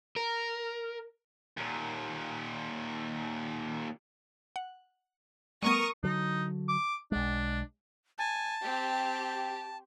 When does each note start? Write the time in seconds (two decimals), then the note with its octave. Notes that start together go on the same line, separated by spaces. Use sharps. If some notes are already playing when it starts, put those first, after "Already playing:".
0.16 A#4
1.57 D#2 A#2
4.56 F#5
5.63 G3 A3 B3 A#4 C#6 D#6
6.04 D3 F#3 D#4
6.68 D6
7.12 B1 G#3 D4
8.18 G#5 A5
8.65 C4 G4